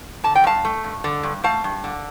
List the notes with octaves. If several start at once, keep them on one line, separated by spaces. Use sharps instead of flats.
D3 A5
G5
G2 F5 A5
A3
G2
D3
G2
A3 F5 A5
G2
D3